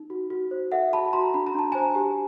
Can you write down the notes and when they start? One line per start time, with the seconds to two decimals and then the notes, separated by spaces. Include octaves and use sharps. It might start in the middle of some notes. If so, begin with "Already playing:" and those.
Already playing: D#4
0.10 F#4
0.30 F#4
0.51 C5
0.72 A4 E5 F#5
0.93 F#4 A5 B5
1.13 F#4 A#5 C6
1.34 D4 B5
1.47 A#5
1.54 D4 A5
1.72 C5 G#5 A#5
1.95 G4